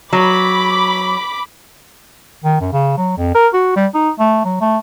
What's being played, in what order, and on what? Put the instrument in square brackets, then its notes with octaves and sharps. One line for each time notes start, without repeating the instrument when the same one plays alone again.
[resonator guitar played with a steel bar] F#3 [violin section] B5 D6
[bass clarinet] D#3
F#2
C#3
F#3
F2
A#4
F#4
G3
D#4
A3
F#3
A3